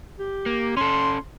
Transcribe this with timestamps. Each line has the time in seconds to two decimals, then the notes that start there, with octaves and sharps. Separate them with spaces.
0.19 G4
0.46 A#3
0.77 C#4 A4 C6